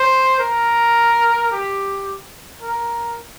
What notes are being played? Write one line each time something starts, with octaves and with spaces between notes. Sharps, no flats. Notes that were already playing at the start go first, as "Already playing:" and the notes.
Already playing: C5
A#4
G4
A#4